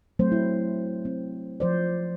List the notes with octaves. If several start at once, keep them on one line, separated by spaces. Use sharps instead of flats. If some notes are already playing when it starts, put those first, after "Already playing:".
F#3 A3 C4 C5
E4
C4
F3 C5 D5